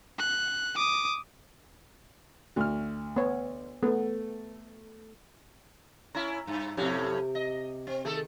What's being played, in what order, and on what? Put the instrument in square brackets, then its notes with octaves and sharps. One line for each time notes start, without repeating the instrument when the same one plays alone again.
[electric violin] F#6
D6 D#6
[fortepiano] D2 F6 [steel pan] F#4
[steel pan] B3 C#5
[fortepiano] A3 [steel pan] B3
[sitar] C#4 E4 [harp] A#5
[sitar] G2
[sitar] F2 A2 C#4 [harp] C3 G4
[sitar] D#5
C4
[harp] D#3 G#4 [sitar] A3 A4